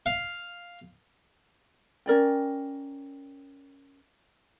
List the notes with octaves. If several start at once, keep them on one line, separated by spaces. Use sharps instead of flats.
F5
C#4 A#4 D5 G5